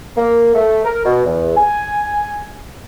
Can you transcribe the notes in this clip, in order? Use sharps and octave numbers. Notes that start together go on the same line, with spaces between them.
A#3
A3
A#4
B2
E2
G#5